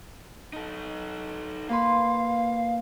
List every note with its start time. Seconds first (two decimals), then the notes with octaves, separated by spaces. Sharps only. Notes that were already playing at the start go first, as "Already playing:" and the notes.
0.53 D#4 A4
1.70 A#3 B4 F5 C6